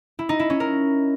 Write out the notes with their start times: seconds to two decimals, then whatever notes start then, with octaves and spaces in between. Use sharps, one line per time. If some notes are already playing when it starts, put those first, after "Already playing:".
0.19 E4
0.29 D#4
0.39 E4
0.50 C#4
0.60 A#4